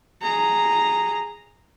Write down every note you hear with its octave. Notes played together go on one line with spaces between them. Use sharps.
G#4 A#5